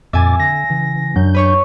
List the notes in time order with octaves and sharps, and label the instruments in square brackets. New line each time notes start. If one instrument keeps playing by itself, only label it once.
[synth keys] F2 [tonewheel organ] A#2 D6 A6 [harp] E5 G#5
[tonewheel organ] D3 [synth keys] A#6
[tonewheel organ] C#3 E3
[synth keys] F#2 F#3 [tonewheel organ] D4 G6
[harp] B4 C#5 C#6